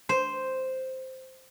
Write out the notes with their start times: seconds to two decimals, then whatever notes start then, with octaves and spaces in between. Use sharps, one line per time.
0.09 C5